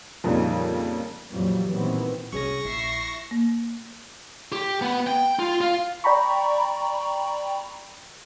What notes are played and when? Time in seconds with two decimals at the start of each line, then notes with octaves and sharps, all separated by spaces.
0.24 F2 A#2 C#3 G3 D#4
1.31 F2 A#2 E3 F#3 G3
1.69 A#2 D#3 E3 B3 C4
2.33 C2 C#4 D4 G#4 C#5 C#6 A#6
2.65 A#1 E4 E5 C7
3.31 A#3
4.52 G4
4.82 B3
5.07 G5
5.39 F4
5.61 F4
6.04 D5 G5 A#5 B5 C#6